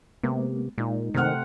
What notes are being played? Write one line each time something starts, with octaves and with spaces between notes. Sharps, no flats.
C3 G#3 A#3 B3
A#2 G#3 D#4
C3 D#3 A3 C4 F#5 F6